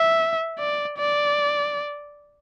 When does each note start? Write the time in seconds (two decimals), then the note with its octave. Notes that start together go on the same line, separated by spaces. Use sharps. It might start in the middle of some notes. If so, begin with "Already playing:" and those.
Already playing: E5
0.59 D5
0.98 D5